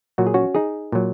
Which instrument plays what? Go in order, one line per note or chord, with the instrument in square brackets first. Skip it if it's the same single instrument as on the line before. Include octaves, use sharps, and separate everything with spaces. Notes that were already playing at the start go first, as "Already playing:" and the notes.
[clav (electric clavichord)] A#2 F#3 F#4
G#4
C#4 F#4
D#4 G#4
A#2 F#3